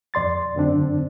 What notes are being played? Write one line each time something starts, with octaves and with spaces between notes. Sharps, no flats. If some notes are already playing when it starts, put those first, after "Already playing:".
F2 D5 C6 A6
F#2 D3 C4 D4